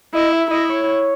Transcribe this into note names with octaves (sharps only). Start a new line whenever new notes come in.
E4 D#5
E5
E4 D#5
C#5